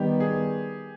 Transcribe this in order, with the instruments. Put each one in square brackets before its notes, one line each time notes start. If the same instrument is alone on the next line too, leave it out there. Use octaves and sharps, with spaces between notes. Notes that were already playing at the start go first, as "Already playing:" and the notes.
Already playing: [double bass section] D#3 G3 B3 [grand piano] G4
[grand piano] G#4